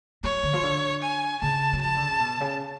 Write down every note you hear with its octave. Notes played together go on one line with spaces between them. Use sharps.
F#3 C#5
D3
F3
D3
G#5
C#3 A5
F#3
F3 A5
D3
C#3
B2
C#3